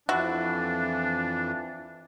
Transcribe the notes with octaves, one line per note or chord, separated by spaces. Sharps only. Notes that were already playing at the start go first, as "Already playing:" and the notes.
F2 E3 D4 E4 F#4